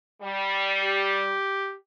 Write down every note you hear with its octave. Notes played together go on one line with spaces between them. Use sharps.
G3
G4